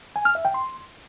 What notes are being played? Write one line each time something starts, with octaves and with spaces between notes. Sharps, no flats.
G#5
F6
E5
G5
C6